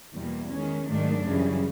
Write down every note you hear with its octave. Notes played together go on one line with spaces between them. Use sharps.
E2 B2 G3 A#3
D#3 G#3 C#4
G#2 D#3 F#3 A3 D4
F#2 C#3 E3 G3